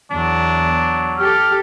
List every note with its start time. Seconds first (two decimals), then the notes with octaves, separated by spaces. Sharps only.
0.12 E2 F#3 D4
1.19 G4 A4 F6